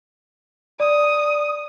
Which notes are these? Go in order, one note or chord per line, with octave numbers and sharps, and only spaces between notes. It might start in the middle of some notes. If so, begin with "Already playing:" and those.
D5 D#6